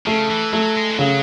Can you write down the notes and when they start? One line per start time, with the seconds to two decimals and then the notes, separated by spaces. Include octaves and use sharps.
0.06 C#3 A3
0.30 E3
0.53 F#3 A3
0.76 G#3
0.90 E3
0.99 C#3 F#3